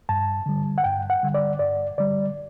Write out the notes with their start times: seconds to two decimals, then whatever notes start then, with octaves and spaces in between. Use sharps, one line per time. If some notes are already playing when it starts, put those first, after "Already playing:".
0.09 G2 A5
0.46 D3 G3
0.78 F#5
0.84 G2 G5
1.10 F#5
1.23 D3 G3
1.34 D5
1.59 G2 D5
1.98 D3 G3 D5